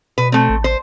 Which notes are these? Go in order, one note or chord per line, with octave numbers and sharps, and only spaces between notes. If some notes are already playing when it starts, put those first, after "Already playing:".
B2 B4
A3 C4
A1
C5